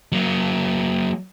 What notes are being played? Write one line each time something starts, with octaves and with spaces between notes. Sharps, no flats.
F#3 A#3